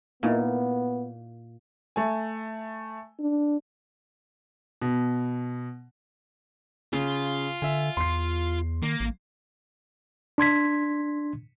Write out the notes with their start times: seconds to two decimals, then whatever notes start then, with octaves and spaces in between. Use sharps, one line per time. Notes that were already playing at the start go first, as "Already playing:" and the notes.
0.23 A#2 A#3 B3 D#4 E4
1.96 A3 G#5
3.20 D4
4.82 B2
6.93 C#3 F4
7.62 D3 E5 G#5
7.97 E2 C6 C7
8.82 D#3 A#3
9.00 A1
10.38 D4 C6 G#6 B6